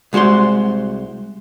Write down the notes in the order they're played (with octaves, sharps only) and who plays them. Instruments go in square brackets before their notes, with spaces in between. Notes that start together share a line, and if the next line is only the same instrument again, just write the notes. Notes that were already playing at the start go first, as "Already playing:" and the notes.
[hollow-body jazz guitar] C2 G#3 F#4 C5 C6